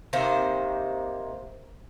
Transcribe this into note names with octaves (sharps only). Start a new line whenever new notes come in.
C3 D#3 A#3 C5